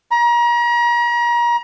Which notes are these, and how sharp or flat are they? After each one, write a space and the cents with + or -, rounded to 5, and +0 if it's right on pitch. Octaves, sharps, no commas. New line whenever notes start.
A#5 +35